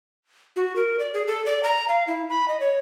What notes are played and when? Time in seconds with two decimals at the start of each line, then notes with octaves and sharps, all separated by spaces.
0.56 F#4
0.76 A#4
0.99 D5
1.14 G#4
1.28 A4
1.46 D5
1.63 A#5
1.88 F5
2.07 E4
2.29 B5
2.48 D#5
2.60 C#5